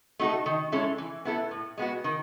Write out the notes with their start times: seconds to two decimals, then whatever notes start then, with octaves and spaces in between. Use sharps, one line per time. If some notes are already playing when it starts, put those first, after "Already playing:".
0.19 A3 D#4 F#4 A4
0.46 D#3
0.72 G#3 C#4 E4 A4
0.98 E3
1.25 B3 E4 A4
1.51 A2
1.78 G#3 B3 F#4
2.04 D#3